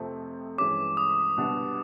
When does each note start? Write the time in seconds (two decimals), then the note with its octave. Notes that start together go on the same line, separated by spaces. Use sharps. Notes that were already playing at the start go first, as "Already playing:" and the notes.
Already playing: F2 C3 F3 A3 C4
0.58 G2 E3 G#3 C#4 D6
0.97 D#6
1.37 C2 B2 G3 B3 D4